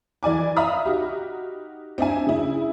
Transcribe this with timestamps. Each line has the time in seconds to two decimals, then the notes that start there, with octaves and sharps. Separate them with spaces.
0.23 E3 D5 G#5 D6
0.56 E5 F5 A#5 B5 D#6 F6
0.86 D#4 F#4 G4
1.98 C4 D4 E5 G#5
2.27 C#3 E4